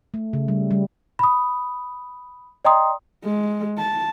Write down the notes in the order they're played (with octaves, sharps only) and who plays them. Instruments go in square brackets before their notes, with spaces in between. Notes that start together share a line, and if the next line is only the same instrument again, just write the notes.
[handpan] A3
C#3
G3
G3
[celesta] B5 D#6
D5 D#5 G5 A#5 C6 D#6
[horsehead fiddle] G#3
A5